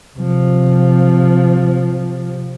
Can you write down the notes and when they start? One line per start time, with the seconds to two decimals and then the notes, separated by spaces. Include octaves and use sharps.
0.16 C3 F3